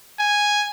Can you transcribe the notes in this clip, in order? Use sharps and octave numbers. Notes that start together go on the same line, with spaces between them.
G#5